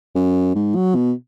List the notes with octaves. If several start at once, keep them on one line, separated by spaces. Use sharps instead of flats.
F#2
G#2
F#3
B2